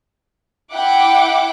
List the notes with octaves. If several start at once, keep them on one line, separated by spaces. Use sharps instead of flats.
E4 F#5 G5 D6